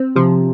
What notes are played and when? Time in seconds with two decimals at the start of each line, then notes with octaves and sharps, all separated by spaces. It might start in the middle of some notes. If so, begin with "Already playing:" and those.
Already playing: C4
0.15 C3 F3